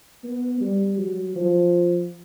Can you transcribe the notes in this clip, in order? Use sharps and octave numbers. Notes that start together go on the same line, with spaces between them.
B3
G3
F#3
F3